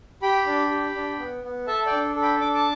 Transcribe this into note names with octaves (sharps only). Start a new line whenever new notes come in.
G4 G5 B5
D4
G4
D4
B3
B3
A4 E5 A5
D5 G5
D4
A4
G5 B5
D4 D6
A5 D6